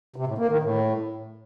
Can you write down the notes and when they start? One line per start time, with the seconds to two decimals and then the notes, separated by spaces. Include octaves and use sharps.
0.16 C3
0.27 A2
0.38 A#3
0.49 D#3
0.60 A2